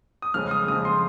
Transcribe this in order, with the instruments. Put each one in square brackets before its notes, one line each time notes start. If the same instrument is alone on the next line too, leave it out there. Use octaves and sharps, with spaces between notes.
[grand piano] D#6
F2 C#3 G#3 F6
D#6
F2 C#3 G#3 D#6
C6